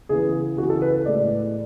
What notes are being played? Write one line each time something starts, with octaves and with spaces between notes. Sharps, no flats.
C#3 E3 B3 G#4
C#3 E3 B3 F#4
A4
B4
A2 G#3 B3 D5